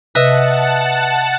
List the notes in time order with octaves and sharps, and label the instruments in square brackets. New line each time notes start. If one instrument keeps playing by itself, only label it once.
[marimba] C3 [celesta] B4 F#6 [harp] D#5 E5 [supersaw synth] F#5 A5